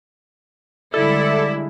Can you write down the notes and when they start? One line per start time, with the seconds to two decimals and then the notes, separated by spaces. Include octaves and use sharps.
0.94 D3 G3 G#3 E4 A4 D5